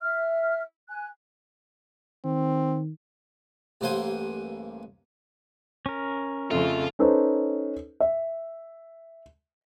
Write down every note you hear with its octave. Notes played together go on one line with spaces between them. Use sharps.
E5 F6
G#5 F#6
D#3 C4
A1 G2 A#3 C5 F#5 G#5
C#4 A#4
F2 C#3 F3 A3 F4
C#4 D#4 A4 B4 C5
E5